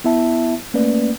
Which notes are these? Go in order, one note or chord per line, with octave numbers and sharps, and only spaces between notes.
B3 E4 E5 A5
A3 A#3 C#4 B4 D5